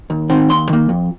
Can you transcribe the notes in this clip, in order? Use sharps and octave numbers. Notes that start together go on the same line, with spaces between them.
D#2
D#3 C4
D#2 C6
D#3 A#3
F2